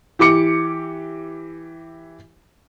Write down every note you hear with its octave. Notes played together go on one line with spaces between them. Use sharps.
E3 G4 D6 C#7